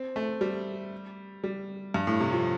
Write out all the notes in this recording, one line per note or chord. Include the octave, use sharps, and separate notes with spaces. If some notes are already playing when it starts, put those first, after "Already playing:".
Already playing: C4
A3
G3
G3
G2
A2
C3
F3